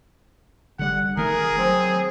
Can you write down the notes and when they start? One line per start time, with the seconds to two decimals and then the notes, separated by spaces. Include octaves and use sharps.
0.79 G1 D3 G3 F#5
1.17 F1 D#3 A3 G#4 A#4
1.58 F#3 C4